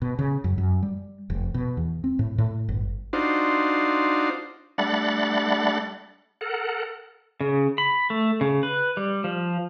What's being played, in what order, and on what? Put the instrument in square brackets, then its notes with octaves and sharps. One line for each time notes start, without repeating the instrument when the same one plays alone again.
[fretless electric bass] B2
C#3
F#2
F#2
G3
F1
B2
E2
C4
A2
A2
G1
[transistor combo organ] D4 D#4 F4 F#4 C5
[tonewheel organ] G3 A3 D4 F#5 B5 A6
A4 A#4 F#5
[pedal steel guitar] C#3
B5
A3
C#3
B4
G3
F3